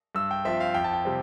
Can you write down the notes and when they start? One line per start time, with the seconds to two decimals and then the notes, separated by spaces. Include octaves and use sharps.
0.15 G2 E6
0.31 G5
0.45 F3 C4 E5
0.60 F5
0.74 F2 G5
0.84 A5
0.93 G5
1.05 C3 G3 C4